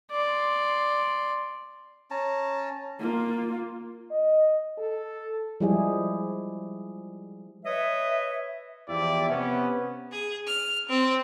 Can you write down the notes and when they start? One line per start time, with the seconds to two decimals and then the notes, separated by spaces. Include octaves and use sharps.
0.11 D5 C6
2.11 C#4 A5 A#5
2.99 A#3 F4
4.11 D#5
4.78 A4
5.60 F3 G3 G#3 E4 G4 G#4
7.65 B4 C#5 D#5 E5
8.89 E2 F3 E4 G4 D5 E5
9.30 C3 B3 C#4
10.11 G#4
10.47 F6
10.88 C4